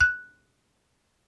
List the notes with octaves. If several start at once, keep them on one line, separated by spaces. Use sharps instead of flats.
F#6